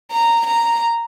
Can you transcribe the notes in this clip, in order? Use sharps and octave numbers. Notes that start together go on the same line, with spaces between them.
A#5
A#5